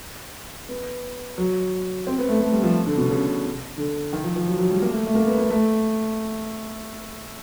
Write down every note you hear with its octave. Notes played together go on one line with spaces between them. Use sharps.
B3
F#3
C4
B3
A3
A3
G3
F3
D3
B2
C#3
D3
D#3
F3
F3
F#3
F#3
G3
A#3
A3
A3
A#3
B3
A#3
A3